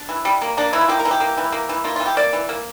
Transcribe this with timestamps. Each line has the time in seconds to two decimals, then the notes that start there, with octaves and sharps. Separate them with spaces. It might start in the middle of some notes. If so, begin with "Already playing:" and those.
Already playing: D4
0.09 E3
0.25 G3
0.41 A#3
0.57 A#3 D4
0.73 E3 E4
0.81 F4
0.89 A#3 G4
0.99 A#4
1.05 E3
1.11 G4
1.20 A#3
1.38 E3
1.52 A#3
1.69 E3
1.84 A#3 F4
1.96 E3 F4
2.06 G4
2.17 A#3 D5
2.33 E3
2.49 A#3